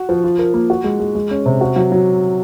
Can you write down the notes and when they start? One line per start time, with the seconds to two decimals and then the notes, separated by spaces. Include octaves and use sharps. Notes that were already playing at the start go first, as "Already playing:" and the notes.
Already playing: F#4
0.09 F3
0.24 F4
0.39 A#4
0.54 A#3
0.70 F#4
0.84 G#3
1.00 G#3
1.15 G#3
1.31 C#4
1.46 C3
1.61 F#4
1.76 F#3
1.92 F#3